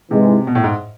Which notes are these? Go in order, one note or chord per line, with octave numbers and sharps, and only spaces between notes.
G#2 C3 E3 G#3
B2
A2
G#2